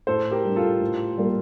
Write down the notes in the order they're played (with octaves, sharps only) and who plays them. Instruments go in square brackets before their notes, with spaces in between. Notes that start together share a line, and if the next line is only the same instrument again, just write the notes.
[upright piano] A2 [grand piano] A4 C5
[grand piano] G4 A#4
[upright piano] G3 D4
[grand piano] F4 A4
[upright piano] A2
G3 A#3